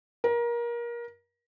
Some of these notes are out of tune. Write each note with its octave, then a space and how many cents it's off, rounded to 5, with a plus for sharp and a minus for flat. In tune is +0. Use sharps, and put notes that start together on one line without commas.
A#4 +25